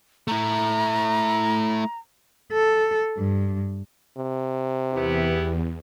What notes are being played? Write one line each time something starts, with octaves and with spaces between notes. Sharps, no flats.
A3 E4 A#5
A4
G2
C3
E2 B3 E4 G4